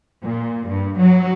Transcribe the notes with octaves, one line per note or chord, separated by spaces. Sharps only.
A#2
G2
F#3